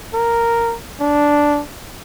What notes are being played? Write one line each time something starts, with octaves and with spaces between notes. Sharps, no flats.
A#4
D4